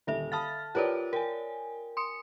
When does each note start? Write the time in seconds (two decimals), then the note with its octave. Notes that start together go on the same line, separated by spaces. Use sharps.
0.07 D#1 D3 A4 E5
0.32 F5 A5 B5 D#6 F6 A6
0.75 F4 G4 A#4 B4 C#5 D5
1.13 A#4 G5 G#5
1.97 C6 D#6 C#7